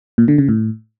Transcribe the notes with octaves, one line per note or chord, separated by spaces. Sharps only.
A#2
D3
C#3
A2